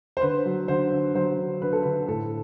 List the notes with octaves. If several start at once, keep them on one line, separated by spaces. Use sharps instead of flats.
C5
D3 B4
F#3
D3 C5
D3
F#3 C5
D3
D3 B4
A4
D3 B4
A2 A4